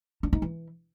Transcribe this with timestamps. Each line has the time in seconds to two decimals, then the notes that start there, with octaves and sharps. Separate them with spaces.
0.23 D4
0.33 D#4
0.42 E3